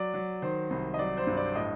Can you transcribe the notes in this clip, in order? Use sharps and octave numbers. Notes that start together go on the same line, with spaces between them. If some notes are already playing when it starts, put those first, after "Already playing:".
Already playing: F#3 D5
F#3
D#3 C5
C2
D#5
F#3 D5
C5
G2
D5
A2 D#5